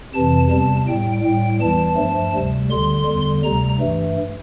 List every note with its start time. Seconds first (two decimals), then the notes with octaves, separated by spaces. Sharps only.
0.14 F2 C3 E3 A5
0.50 E2 C3 G3 A5
0.87 A2 G3 G5
1.23 A2 G3 G5
1.60 E2 E3 G3 A5
1.96 G2 F3 A3
2.34 D2 C3 G3
2.70 D2 D3 G3 C6
3.06 E2 D3 G3
3.43 D2 C3 G3 A#5
3.80 G2 E3 A3